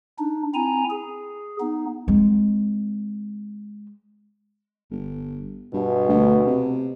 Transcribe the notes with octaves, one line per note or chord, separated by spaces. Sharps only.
D4 D#4
C4 E4 G#5 A#5
G#4
B3 D#4
G#3 C4
G1
G2 B2
D2
C3